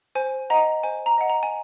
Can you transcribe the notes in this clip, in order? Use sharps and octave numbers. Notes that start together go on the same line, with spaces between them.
C5 G#5
D#5 F#5 A#5
C5 G#5
A#5
D#5 F#5
A#5
G#5